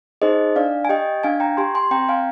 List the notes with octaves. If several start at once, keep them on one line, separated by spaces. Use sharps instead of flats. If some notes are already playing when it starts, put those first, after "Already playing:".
D#4 G#4 C5 D#5
D4 D5 F5
G#5
G4 D#5 G5
D4 F5 G#5
G5 A#5
G4 G#5 C6
G#5 C6
C4 G5 A#5
F5 G#5